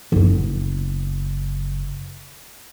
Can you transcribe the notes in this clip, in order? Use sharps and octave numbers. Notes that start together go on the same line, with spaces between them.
F#1 B3